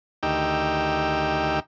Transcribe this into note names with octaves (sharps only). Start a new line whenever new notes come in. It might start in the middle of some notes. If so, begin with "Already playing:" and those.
D2 D#3 D#4 G4 G5 E6